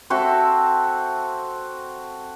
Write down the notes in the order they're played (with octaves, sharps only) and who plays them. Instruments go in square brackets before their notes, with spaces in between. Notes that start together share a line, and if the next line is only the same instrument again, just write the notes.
[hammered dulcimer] C4 F#4 A4 E5